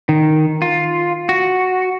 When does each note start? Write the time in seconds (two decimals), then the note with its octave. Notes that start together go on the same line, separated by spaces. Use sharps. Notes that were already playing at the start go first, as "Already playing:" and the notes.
0.09 D#3
0.62 F4
1.29 F#4